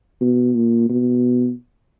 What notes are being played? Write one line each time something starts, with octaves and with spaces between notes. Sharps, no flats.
B2
A#2
B2